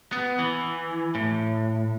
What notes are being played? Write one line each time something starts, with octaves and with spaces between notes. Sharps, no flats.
B3
E3
A2